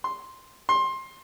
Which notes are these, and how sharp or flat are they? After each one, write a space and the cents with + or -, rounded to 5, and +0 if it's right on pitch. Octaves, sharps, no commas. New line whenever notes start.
C6 +0
C6 +20